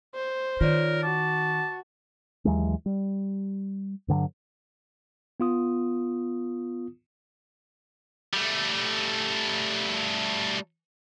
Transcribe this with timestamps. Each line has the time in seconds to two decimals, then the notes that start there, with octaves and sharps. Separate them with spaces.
0.15 C5
0.61 D#3 F4 A#4 C#5 D5
1.03 F#4 A5 D6
2.45 D#2 E3 F#3 G#3
2.86 G3
4.08 G2 D3 E3 F#3
5.40 B3 F4 D#6
8.33 G3 A3